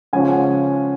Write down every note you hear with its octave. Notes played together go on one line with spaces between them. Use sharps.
C#3 F3 G#3 C#4 G#5
F#5